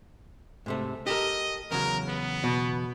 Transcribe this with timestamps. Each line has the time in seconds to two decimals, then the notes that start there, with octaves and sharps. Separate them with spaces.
0.66 G#2 C3 A3
1.07 G4 A4 A#4 D#5
1.71 E2 C#3 F#3 A#4
2.08 B3
2.44 B2